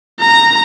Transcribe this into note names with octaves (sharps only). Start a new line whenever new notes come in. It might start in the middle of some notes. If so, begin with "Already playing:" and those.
A#5